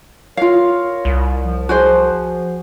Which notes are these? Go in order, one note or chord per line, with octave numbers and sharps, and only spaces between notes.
F4 A#4 C#5 F5
C2
F3
F#4 G#4 C5